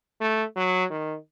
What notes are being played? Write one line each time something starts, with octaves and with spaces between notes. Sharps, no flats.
A3
F#3
D#3